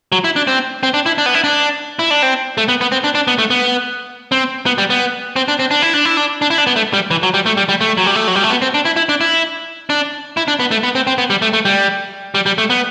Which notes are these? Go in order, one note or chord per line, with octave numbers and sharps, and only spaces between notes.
F#3
E4
D4
C4
C4
D4
E4
D4
B3
E4
D4
E4
D4
C4
A3
B3
B3
C4
D4
D4
B3
A3
B3
C4
B3
G3
B3
C4
D4
C4
D4
E4
D4
E4
D4
D4
E4
D4
B3
A3
G3
E3
F#3
G3
A3
G3
G3
A3
F#3
G3
A3
F#3
G3
A3
B3
C4
D4
E4
E4
D4
E4
D4
E4
D4
B3
A3
B3
C4
C4
B3
G3
A3
A3
G3
G3
G3
A3
B3